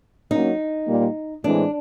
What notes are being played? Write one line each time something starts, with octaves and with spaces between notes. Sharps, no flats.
F#3 A#3 C#4 D#4
A#2 G3 A#3
A2 E3 G#3 C4 D4